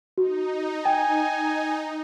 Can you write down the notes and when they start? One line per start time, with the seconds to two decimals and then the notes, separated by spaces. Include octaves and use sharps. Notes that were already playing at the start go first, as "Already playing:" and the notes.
0.18 D#4 F#4
0.85 G5 G#5